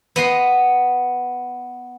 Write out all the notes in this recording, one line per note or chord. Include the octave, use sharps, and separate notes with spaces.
B3 D#5 C6